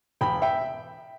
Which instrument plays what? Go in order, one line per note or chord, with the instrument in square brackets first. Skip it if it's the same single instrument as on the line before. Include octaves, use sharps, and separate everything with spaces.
[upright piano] E1 G5 B5
E5 G5